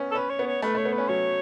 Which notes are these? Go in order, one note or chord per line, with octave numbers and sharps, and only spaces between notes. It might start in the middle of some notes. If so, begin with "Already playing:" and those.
Already playing: B3 C#4
A4
C#4 B4
C#5
B3
C#5
A3 B4
A3 C#5
B3
B4
C#4
F#3 C#5